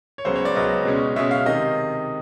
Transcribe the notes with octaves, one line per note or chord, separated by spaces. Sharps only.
C#5
C#2 C#3 F#3 B3 C5
C#5
D5
C#2 C#3 F#3 B3 D#5
B2 G#3 C#4
B2 G#3 C#4 E5
F5
C3 D#3 D#5